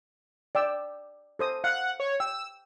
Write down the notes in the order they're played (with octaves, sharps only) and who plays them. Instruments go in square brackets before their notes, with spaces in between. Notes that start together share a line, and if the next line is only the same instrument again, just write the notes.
[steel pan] D5 G5 E6
A4 C5 D#6
[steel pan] F5 [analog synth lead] F#5
[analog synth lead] C#5
[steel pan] G5 [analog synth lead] E6